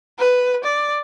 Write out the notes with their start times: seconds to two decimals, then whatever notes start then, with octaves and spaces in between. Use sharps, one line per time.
0.19 B4
0.64 D5